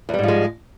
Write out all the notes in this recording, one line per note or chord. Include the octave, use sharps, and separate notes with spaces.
E2 G#2 F3 G3 G#3